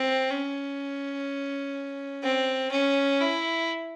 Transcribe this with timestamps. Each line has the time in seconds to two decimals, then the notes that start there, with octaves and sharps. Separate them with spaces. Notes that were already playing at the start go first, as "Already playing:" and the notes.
Already playing: C4
0.30 C#4
2.23 C4
2.71 C#4
3.20 E4